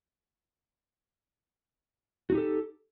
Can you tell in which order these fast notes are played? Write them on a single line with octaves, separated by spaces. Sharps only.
F#4 D#4 G4 A4